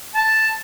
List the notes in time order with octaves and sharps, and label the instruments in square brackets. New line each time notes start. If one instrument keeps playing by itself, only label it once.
[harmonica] A5